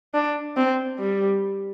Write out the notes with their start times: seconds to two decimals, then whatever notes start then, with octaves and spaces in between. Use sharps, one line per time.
0.14 D4
0.57 C4
0.99 G3